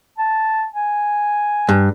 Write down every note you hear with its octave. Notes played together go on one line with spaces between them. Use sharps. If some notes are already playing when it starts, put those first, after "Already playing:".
A5
G#5
G2